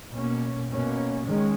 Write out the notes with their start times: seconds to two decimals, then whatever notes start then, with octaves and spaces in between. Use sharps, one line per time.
0.12 B2 A#3 C#4
0.69 B2 A#3 C#4
1.26 D#3 G#3 C#4